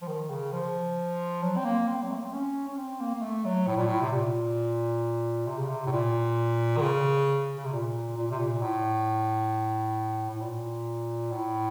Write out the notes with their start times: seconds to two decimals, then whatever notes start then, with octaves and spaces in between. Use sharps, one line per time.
0.02 F3
0.08 D#3
0.30 C#3
0.53 F3
1.43 F#3
1.57 C4
1.65 A#3
1.88 C4
2.03 F#3
2.10 A3
2.18 A#3
2.26 C4
2.33 C#4
2.68 C#4
2.78 C4
3.01 A#3
3.14 A#3
3.22 A3
3.45 F#3
3.67 A2
3.77 A#2
3.87 A2
4.02 C3
4.12 A#2
5.47 C3
5.58 C#3
5.69 C3
5.86 A2
5.92 A#2
6.77 D#3
6.82 C#3
7.58 C#3
7.65 C3
7.72 A#2
8.16 A#2
8.31 C3
8.40 A#2
8.62 A2
10.31 A2
10.41 A#2
11.32 A2